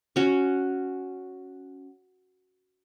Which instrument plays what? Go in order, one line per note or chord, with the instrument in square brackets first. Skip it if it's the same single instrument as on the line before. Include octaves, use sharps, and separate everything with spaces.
[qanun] C#4 F#4